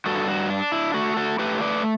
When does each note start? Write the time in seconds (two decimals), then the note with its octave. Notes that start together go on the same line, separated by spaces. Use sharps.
0.06 G2 F#4 A4
0.28 F#4
0.50 D4
0.72 E4
0.94 A3 F#4
1.17 F#4 A4
1.39 A3 G4 B4
1.61 B4 D5